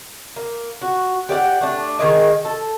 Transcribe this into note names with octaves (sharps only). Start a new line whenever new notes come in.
A#3
F#4
G4 D5 F5 F#5
A3 D4
D#3 G4 G#4 D#5
A4